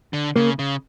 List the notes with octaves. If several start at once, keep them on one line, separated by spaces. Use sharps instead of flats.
D3
C#3 A#3
C#3